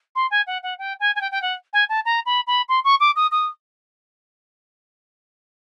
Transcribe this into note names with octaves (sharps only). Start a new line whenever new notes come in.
C6
G#5
F#5
F#5
G5
G#5
G#5
G5
G5
F#5
G#5
A5
A#5
B5
B5
C6
C#6
D6
D#6
D#6